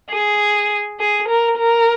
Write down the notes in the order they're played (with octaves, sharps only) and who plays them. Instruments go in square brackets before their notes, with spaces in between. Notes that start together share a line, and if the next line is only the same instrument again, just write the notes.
[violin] G#4
G#4
A#4
A#4